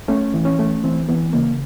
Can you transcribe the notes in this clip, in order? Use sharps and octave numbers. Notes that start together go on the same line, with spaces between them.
A3 C#4
E3
C#4
A3
E3 C4
E3 B3
C#3 A#3